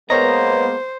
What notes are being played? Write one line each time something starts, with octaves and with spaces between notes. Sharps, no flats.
G#3 A#3 B3 A#4 C5 C#5 D#5 A#5